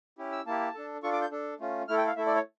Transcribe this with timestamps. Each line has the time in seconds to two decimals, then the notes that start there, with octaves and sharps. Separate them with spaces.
0.18 C#4 E4 G4
0.32 E6
0.46 A#3 E4 G4 A5
0.74 D4 A4
1.03 D4 F4 A4 C#6
1.12 D6
1.22 G6
1.31 D4 A4
1.60 A3 C#4 F4
1.88 A3 E4 A4 F6
1.97 G5
2.07 F5
2.16 A3 E4 A4 E5
2.26 D5
2.36 C#5